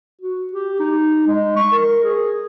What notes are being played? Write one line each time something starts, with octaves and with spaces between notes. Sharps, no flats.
F#4
G4
D#4
G#3
C#6
A#4
G#4